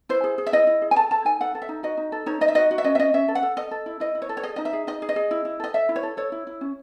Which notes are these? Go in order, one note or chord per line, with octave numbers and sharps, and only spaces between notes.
E4 C5
G#4
G#4
E5
E4 D#5
E4
G#4
G#5
A4 A5
A4 A5
D#4 G#5
A4 F#5
A4
E5
D#4
F#4 D#5
D#4
A4
D#4 C#5
D#4 D#5
E5
F#4 D#5
F#4
E5
C#4 D#5
E5
C#4 D#5
C#4 E5
A4
F#5
A4
A4 D#5
A4
E4
E4 D#5
E4
C#5
A4
C#5
G#4 D#5
D#4 D#5
E5
G#4
D#4 D#5
G#4
D#5
G#4
E4
E4
A4 D#5
A4 E5
E4
C#5
A4
A4 C#5
E4
E4
C#4